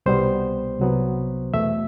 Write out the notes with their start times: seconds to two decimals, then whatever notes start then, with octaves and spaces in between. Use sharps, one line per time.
0.06 C2 B2 G3 B3 C5
0.80 C2 C3 F#3 B3
1.53 E2 B2 A3 E5